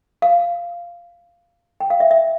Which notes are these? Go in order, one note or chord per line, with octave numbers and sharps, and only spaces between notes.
F5
G5
F5
E5
E5